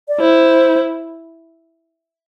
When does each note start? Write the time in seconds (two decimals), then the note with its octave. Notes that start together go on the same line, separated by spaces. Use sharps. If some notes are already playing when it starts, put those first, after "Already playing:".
0.08 D5
0.19 E4 C5